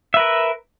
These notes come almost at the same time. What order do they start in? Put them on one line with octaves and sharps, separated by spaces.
E5 B4 A#4